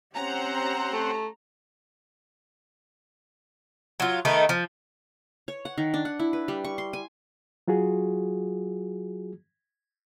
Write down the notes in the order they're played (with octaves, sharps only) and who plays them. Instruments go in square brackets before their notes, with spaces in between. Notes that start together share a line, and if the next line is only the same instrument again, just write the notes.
[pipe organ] C4 C5 F#5 [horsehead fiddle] C#4 G4 [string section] A#5
[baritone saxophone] A3
[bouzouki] F#3 F4
D#3 A3 B3 D#4
F3
[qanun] C#5
F#5
D#3
D4
F#5
E4
B4
G3
C#6
C6
G#5
[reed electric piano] F#3 F4 F#4 G#4